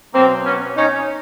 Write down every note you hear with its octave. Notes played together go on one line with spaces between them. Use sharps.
B2 F#3 A#3 C4
B3 C#4
C#4 D#4